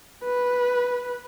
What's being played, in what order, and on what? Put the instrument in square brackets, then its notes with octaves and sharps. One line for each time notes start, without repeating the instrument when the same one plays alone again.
[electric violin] B4